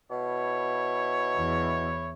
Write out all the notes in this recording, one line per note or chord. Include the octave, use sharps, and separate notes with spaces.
B2 E4 C#5
E2